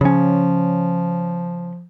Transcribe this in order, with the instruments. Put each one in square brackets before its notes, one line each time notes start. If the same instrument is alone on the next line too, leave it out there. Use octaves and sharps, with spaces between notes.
[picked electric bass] C#3 C#4 [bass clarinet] F3